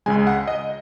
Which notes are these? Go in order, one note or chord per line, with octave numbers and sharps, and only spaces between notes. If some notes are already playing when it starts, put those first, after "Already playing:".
C#2 C#3 G#3 G#5
F#5
D#5